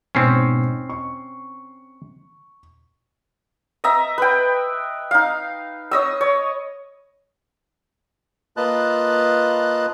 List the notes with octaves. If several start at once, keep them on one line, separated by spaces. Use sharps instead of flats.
G#2 B2 C4 C#4 C7
C#6
D#5 E5 A#5
B4 G5
D#4 F5
C#5 D#5 E6
C#5
A#3 F4 B4 D#5 A5 F#6